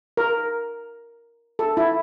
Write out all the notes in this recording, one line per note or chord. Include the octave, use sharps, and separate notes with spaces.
A#4
A4
E4